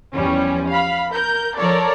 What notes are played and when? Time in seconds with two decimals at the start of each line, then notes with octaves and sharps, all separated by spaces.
0.15 E2 F3 G3 C#4
0.69 F5 B5
1.11 A#4 G6
1.58 F3 A4 A#4 C#5 D5